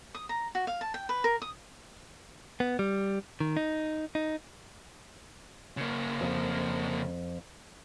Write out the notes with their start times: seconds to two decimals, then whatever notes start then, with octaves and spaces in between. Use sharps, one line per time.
0.15 D#6
0.29 A#5
0.55 F#4
0.67 F5
0.81 A5
0.94 G5
1.09 B4
1.24 A#4
1.42 D#6
2.60 B3
2.79 G3
3.40 D#3
3.57 D#4
4.15 D#4
5.77 C#3 A#3
6.21 F2